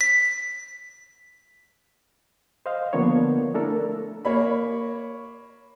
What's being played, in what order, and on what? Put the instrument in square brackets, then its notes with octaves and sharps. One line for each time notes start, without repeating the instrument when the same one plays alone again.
[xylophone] B6
[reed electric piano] C5 D#5 F5
D3 F3 A#3 B3 D4 C#5
A3 D4 E4 A4 A#4
[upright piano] A#3 C#5 B5